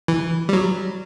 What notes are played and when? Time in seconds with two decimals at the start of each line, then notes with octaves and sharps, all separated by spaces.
0.08 E3
0.49 G3
0.53 F#3